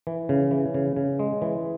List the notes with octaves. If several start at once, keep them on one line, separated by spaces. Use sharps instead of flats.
E3
C#3
E3
C#3
C#3
G#3
E3